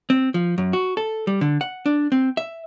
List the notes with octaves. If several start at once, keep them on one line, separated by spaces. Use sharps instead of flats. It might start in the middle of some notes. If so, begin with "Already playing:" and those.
C4
F3
F#2
F#4
A4
G3
D3
F#5
D4
C4
E5